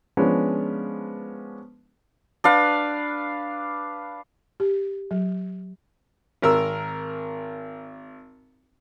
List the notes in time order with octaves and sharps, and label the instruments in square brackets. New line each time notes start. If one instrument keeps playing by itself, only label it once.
[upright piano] F3 G#3 B3 C#4 D4 B4
[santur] D4 B4 F5
[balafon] G4
F#3
[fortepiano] G#1 A#4 E6